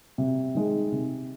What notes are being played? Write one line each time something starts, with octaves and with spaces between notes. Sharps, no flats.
C3
D#3 G#3
C3